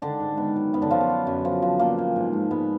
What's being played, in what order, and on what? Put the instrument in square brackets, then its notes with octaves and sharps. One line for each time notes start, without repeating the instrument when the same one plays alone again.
[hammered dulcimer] D3 D#3 D4
G#2
D#3 B3
F#3
F#2 B3
D3 D4
F3 F#3 F4
B3
F#3
F#2
F3
F3
A#2 A#3
A#2
G#2
G#2
G#2 B3